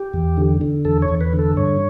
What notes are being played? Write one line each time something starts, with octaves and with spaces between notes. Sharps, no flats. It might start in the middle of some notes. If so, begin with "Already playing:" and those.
Already playing: G4
E2
D3
D3
E2 A4
C#5
E2
B4
D3
A4
G2 C#5